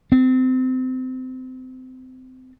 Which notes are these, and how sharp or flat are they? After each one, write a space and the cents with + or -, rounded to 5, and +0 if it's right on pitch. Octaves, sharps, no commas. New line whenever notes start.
C4 -30